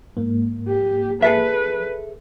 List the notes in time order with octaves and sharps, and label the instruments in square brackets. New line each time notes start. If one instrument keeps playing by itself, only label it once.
[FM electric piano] G#2 A#3
[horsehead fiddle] G4
[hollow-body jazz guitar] G#4 A4 E5 [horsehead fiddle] B4